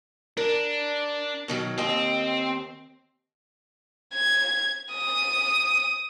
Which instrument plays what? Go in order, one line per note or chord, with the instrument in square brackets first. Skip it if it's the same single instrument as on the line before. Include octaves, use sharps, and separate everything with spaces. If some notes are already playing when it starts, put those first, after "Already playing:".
[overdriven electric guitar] D4 [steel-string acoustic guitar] A#4
[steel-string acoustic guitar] B2 D#3 F#3
[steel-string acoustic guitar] D#2 D#5 G5 [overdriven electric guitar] C4
[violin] G#6
D#6